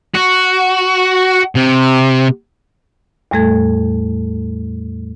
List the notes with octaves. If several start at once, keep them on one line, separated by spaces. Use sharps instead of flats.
F#4
C3
E2 A2 G3 A3 A4 G#6